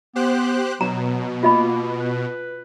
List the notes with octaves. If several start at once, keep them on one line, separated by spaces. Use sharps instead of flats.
B3 G4 C5 F#6
B2 F#3 A#5
A#3 F4 D#5 B5
B4